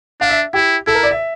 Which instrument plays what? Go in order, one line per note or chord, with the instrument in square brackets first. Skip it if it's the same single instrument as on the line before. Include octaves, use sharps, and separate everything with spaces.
[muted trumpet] D4 [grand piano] F5
[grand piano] E5
[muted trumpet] E4 [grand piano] G4
[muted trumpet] E4 [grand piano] A4
[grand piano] A#4
D5
E5